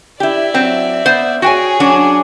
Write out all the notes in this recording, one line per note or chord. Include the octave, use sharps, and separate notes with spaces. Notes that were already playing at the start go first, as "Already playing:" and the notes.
E4 G4 D5 E5
F#3 C4
B3 C5
F#4 G#4 C#5 G5 G#5
F#3 C#4 D4